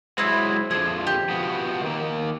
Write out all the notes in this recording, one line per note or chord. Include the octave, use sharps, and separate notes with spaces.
F#3 G#3 C4 E4
F2 D3 F3 G#4
G4
F3 B3 F#4
D#3 A#3